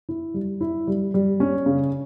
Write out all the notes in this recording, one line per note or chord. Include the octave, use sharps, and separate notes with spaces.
E4
G3
E4
G3
G3
C#4
C#3